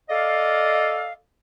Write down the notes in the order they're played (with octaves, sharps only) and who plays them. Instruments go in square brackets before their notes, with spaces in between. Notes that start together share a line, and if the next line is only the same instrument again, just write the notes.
[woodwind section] A4 D5 D#5 F5